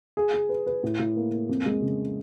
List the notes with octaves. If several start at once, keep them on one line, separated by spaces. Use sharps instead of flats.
G#4
G#4
B4
B4
A2
A2
A#3
A#3
F2
G#3
C#3